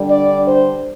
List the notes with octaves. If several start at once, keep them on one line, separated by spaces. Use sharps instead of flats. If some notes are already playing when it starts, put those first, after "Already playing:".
Already playing: D3 G3 D4
D5
C5